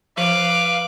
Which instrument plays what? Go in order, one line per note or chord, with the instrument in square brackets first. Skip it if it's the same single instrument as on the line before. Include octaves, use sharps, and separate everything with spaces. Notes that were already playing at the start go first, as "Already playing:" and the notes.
[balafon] F3 [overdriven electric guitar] B4 [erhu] F5 [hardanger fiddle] D6